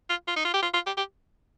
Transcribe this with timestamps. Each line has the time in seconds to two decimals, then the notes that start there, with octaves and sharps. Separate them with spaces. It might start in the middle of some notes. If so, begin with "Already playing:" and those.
0.09 F4
0.28 F4
0.36 D#4
0.45 F4
0.53 G4
0.62 F4
0.74 F4
0.86 G4
0.97 G4